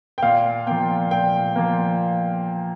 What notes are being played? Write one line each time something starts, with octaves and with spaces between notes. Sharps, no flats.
G5
A#2 F5
F3 A#3 G5
A#2 G5
F3 A#3